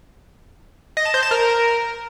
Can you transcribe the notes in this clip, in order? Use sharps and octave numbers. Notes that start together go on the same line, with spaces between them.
D#5
A5
C5
A5
A#4